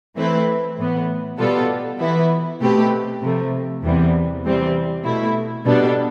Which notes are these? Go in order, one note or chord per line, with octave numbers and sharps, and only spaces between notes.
E3 A3 C4 E4 B4
A2 E3 B3
B2 G3 B3 F4 A4
E3 B3 E4 B4
B2 A3 C4 G4 B4
C3 F3 A3
E2 C3 E3 G3 B3
C3 E3 G3 C4
B2 A3 E4
B2 G3 B3 D4 A4